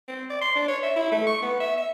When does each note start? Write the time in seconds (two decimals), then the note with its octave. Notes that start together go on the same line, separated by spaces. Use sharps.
0.08 C4
0.30 D5
0.42 C6
0.56 D4
0.68 C#5
0.83 E5
0.96 E4
1.12 A3
1.27 C#6
1.42 B3
1.60 E5
1.77 E5